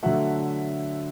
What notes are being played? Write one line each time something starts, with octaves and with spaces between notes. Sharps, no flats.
D3 F#3 A3 E5 F#5